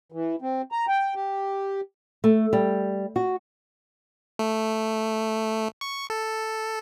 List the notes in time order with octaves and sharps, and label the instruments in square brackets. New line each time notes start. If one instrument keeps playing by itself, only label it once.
[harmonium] E3
C4
A#5
G5
G4
[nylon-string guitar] A3
G3
F#4
[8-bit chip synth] A3
C#6
A4